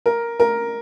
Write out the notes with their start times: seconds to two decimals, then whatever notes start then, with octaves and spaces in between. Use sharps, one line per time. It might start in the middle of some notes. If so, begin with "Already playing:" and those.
0.06 A#4
0.40 A#4